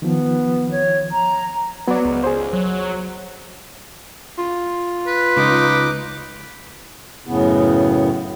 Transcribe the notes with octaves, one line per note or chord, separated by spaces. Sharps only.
D#3 F3 B3
C#5
A#5
F#3 B3 D5
C#2
G#4 C5
F#3
F4
B4
C#2 D#4 D6
F#2 A2 C#3 B3